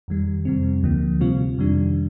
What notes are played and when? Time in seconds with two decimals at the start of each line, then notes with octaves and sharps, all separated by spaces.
0.08 F2 D#3 G3
0.45 F2 C3 G3 C4
0.83 D2 D3 F3 A#3
1.21 C3 G3 C4 F4
1.58 F2 C3 D#3 G3 D4